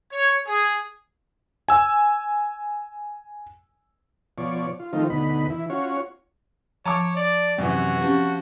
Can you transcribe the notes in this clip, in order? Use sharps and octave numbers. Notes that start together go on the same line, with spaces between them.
C#5
G#4
G#5 E6
B2 F3 C#5 D5
F4
D#3 F3 A3 C4 D#4 F4
D2 B2 D#4 B5
E3 E4
C#4 F4 F#4 C#5
F3 C#5 A5 A#5 D6
D5
F#2 C3 E3 F#4
F3 C4 C#4 G4